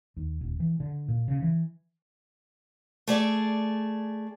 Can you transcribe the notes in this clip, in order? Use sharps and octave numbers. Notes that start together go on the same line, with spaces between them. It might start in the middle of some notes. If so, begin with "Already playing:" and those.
D#2
D#1
E3
D3
A#2
C#3
E3
A3 G#4 D5